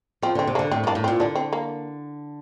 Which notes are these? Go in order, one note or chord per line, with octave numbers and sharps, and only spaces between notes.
F3 C4
D3 C4
C3
A#3 D4
D3
A2 C4
G2 A#3 D4
A2
C4
A#2
D3 A#3 D4
C4
A#3